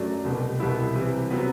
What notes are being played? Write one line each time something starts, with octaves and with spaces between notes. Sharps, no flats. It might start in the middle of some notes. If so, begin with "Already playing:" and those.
Already playing: F#2 F#3 A3 D4
C2 B2 G3
C2 B2 G3 B3 E4
C3 E3 G3
C3 F#3 B3